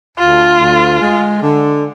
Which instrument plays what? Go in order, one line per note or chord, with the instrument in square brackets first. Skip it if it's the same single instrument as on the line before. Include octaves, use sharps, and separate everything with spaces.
[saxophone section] D2 [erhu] F4
[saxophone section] D2
G#3
D3